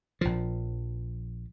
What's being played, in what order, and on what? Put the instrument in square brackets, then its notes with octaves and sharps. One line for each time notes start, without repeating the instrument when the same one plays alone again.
[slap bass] A#1 F3